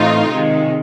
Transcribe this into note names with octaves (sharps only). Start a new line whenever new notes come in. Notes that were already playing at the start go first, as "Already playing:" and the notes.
Already playing: A2 E3 A3 C4 D#4 F4
C3 D#3 G#3